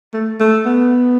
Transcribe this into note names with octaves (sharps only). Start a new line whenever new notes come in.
A3
A3
B3